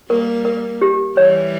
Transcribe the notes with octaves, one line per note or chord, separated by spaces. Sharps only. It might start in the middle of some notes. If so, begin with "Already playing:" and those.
G3 A#3 A#4
A#4
G4
E3 G3 C#5